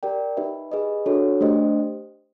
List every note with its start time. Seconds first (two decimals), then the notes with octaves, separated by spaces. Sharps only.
0.03 G4 A#4 D5 G5
0.37 D#4 G4 B4 E5
0.72 G#4 B4 D#5
1.06 D4 F#4 A4 C#5
1.41 A3 D4 G4 C5 D#5